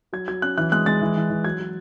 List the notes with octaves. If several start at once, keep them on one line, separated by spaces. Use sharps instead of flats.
F#3 G#6
F#3 G#6
C#4 F#6
E3 F#6
G#3 F#6
G#3 A6
E3
E3
E3
F#3 G#6
F#3